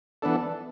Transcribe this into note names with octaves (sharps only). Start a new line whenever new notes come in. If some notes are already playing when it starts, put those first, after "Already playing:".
E3 B3 D4 A4